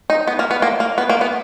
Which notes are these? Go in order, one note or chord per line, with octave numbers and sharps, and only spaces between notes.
D#4
B3
A#3
B3
A#3
A#3
B3
A#3
B3